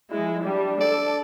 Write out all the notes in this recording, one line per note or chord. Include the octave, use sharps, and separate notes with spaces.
F3 G#3 E4
G3 D4
A4 D5